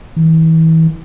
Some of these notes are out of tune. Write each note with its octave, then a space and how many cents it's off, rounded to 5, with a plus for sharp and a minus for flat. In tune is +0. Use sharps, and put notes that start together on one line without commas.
E3 -35